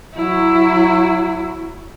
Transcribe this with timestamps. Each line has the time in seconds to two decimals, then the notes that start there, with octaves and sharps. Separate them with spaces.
0.15 F#3 E4